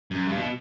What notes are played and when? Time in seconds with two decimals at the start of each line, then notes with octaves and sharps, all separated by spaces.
0.11 F#2
0.28 G2
0.37 B2